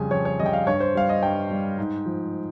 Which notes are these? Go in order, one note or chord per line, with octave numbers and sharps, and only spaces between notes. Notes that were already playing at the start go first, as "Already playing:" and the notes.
Already playing: F2 C#3 G3 G#5
F2 C#5
C#5
C#3 G3 D#5
G5
F5
G2 C#5
C5
G3 F5
D#5
G2 G5
G3
G#2
F3